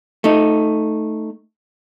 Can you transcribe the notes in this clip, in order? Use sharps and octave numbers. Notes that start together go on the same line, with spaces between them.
A3 D#4